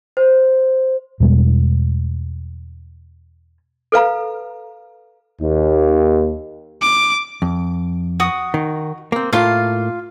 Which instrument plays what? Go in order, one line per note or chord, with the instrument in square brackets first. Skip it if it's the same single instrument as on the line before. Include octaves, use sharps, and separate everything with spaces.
[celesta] C5
[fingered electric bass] E2 B2 G3 G#3
[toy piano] A4 B4 F5 A#5
[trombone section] D#2
[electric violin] D6
[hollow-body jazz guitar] F2
[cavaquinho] F#4 D#6
[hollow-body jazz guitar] D#3
A#3 C4
[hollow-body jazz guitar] A2 A3 A#3 [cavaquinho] F4 F5